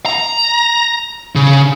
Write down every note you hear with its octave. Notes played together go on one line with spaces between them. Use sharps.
A#5
C#3